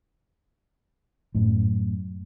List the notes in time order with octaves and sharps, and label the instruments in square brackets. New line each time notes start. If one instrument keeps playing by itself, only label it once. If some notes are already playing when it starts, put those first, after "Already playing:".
[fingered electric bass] F#2 A2